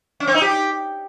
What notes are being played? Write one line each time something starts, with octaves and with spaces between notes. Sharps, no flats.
C#4
C4
D#4
G4